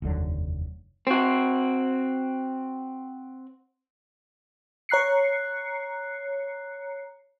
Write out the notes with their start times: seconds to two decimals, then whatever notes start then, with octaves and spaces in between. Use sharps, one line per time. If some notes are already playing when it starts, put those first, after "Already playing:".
0.02 F1 D#2 D3 F#3
1.07 C4 F#4
4.89 C#5 A#5 F#6 C7 C#7